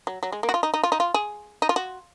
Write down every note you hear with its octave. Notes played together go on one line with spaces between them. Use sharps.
F#3
F#3
G#3
A#3
F#4
F4
D#4
D#4
F4
D#4
F4
G#4
D#4
F4
F#4